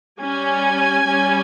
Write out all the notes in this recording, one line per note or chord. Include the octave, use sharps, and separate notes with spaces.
G3 C#4 G#5
G3 C#4